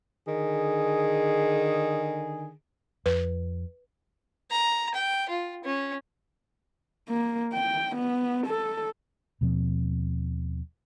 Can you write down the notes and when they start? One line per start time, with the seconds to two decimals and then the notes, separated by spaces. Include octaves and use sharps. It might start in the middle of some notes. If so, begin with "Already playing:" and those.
0.28 D3 D#3 G#4
3.06 F2 B4
4.51 A#5
4.94 G5
5.29 F4
5.64 C#4
7.09 A#3
7.54 G5
7.96 B3
8.47 A4
9.41 D#2 B2 F3 C4